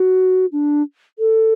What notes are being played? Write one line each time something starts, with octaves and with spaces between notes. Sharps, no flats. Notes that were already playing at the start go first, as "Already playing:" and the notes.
Already playing: F#4
D4
A4